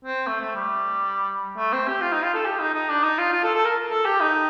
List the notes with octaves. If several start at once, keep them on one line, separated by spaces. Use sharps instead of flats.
C4
A3
A3
G3
A3
C4
G4
F4
D#4
F4
A4
G4
D#4
D#4
D4
D#4
F4
F4
A4
A4
A#4
A4
G4
D#4